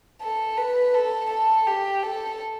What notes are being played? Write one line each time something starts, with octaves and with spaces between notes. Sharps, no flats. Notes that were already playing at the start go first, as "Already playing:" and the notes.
A4
B4
A4
A4
G4
A4